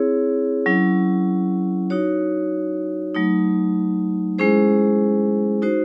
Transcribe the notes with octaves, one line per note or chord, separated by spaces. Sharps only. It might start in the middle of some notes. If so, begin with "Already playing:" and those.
Already playing: C4 E4 G#4 C#5
F#3 C#4 E4
D#4 F#4 C#5
F#3 A3 D#4
G#3 C#4 E4 G#4 C5
D#4 F#4 C5